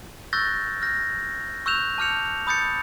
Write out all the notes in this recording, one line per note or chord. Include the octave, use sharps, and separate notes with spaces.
C#6 E6 F#6 G6 A6 A#6
F6 G6 A#6
C#6 E6 F#6 G6 E7 F7
A5 D6 F6 G6 C#7 F7
B5 D#6 G6 A6 C#7